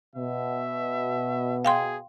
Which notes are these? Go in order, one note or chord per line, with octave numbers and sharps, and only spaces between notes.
B2 E5
G#4 F5 G5 C6